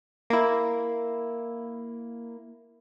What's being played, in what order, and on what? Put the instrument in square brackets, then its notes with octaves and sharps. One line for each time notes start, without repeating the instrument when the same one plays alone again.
[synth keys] A#3 E4